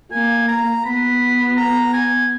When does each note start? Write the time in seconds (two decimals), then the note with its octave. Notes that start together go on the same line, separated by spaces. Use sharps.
0.12 A#3 G#5
0.48 A#5
0.84 B3 B5
1.57 A#5
1.93 G#5